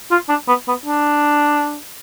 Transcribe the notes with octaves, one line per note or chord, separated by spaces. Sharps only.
F4
D4
B3
B3
D4